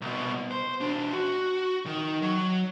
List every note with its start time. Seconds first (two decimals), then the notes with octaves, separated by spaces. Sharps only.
0.01 C2 B2
0.51 C5
0.81 B2 D4
1.13 F#4
1.86 D#3
2.22 F#3